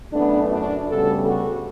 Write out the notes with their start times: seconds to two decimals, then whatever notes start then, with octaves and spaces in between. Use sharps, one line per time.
0.13 F#2 E3 A3 B3 D4
0.50 D4 F#4
0.87 D2 C#3 G3 B3 F#4 A4
1.24 F#4 A4